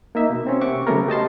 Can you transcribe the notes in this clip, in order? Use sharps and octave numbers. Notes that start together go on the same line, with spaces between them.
A#3 D#4 E5
B2
C4 C#4
C3 E5 F#5 C#6 D6
C#3 F#3 A3 B3 A#4
G4 D#5 A5 C6